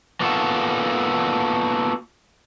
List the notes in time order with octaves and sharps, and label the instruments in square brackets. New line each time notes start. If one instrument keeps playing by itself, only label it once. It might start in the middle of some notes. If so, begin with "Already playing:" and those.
[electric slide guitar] A#3 B3 F4 F#4 A4